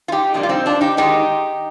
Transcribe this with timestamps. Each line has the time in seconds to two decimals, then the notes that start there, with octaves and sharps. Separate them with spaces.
0.08 F4
0.12 D#4 G4
0.34 F2 C3 G3 A#3 D4
0.43 F4
0.49 C4 D#4
0.66 D4 F4
0.81 D#4 G4
0.97 G#2 D#3 G#3 D#4 G4